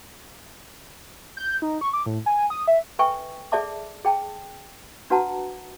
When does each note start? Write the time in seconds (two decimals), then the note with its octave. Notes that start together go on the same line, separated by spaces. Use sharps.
1.37 G6
1.62 D#4
1.81 C#6
1.93 D6
2.06 A2
2.26 G#5
2.50 D#6
2.68 E5
2.99 A4 B4 E5 G5 G#5 C#6
3.52 G#4 A4 D5 E5 A5 D6
4.05 G#4 G5 A5
5.10 D4 F#4 B4 F#5 A5 A#5